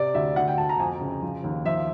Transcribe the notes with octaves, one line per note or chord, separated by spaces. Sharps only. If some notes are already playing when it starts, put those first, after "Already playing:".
Already playing: C3 D5
D2 E5
D2 F#5
G5
D2 A5
A#5
F2 G#5
C#3
F3
D#2
F3 E5